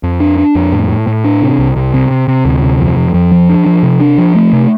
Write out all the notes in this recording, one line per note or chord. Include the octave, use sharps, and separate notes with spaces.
F2
D4
D4
F2
A2
A2
A2
D4
C3
C2
C2
C3
C3
C3
D2
C3
F2
F2
F2
F3
D4
F3
C3
D4
F3
A3
C3